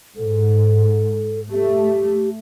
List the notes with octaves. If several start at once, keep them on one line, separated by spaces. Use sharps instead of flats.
G#2 A4
A3 G4